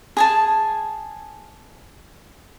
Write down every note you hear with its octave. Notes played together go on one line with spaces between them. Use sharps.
G#4 G#5 A5